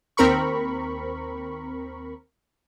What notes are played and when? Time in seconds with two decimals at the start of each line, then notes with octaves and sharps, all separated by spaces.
0.17 D#2 C4 A#4 B5 C#6